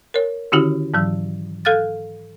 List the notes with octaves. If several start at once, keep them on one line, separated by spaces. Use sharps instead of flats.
A#4 C#5
D3 D#3 C#4 E4 F#4 G4
G#2 E3 F#3 E6
A4 F5 F6 F#6 A6